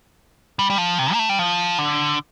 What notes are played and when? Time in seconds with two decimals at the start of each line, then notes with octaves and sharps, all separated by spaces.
0.59 G3
0.70 G3
0.78 F3
0.99 C3
1.13 A#3
1.19 A3
1.29 G3
1.39 F3
1.78 D3